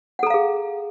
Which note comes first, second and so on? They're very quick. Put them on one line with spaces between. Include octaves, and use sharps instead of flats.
F#5 A4 A#5 F5 G#4